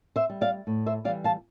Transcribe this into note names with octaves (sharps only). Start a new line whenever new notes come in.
C5 E5
G3
D5 F5
A2
C5 E5
E3 G3 D5 F5
F5 A5